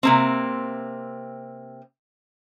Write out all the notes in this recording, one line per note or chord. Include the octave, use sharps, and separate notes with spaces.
C3 A#3 C4